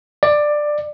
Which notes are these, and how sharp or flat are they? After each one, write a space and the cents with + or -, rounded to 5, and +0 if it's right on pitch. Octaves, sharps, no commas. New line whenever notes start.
D5 +15